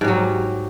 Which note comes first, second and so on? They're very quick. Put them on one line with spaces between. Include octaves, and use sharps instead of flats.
G#2 G3 F#3